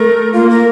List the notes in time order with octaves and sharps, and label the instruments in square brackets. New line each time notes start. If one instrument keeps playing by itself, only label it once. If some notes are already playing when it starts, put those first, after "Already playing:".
Already playing: [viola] A3 [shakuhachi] A#4
[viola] A#3 [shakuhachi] F4
[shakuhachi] A#4